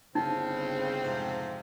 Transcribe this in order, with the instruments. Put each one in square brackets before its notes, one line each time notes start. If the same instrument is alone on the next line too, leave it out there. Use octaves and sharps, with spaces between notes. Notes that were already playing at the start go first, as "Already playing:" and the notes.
[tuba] G1 [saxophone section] C#3 [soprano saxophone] C4 [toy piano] D#4
[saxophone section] F2 G#2 C3